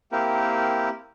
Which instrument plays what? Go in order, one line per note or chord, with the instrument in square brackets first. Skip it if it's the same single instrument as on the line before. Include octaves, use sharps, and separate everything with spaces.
[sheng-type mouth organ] A#3 C4 E4 G4 A#4